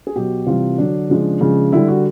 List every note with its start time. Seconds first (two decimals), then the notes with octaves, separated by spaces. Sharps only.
0.07 G#4
0.16 B2 F#3 G4
0.47 C3 E3 G3 F4
0.78 D3 F#3 D4
1.09 C#3 F3 G#3
1.41 C#3 F3 G#3
1.72 D3 G3 E4
1.88 F#4